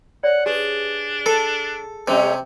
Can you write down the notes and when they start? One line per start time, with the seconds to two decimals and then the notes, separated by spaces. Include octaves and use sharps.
0.23 C#5 D5 F#5
0.46 D4 G4 G#4 B4
1.26 A4 A5
2.08 C3 G3 A3 C#4 D#5 E5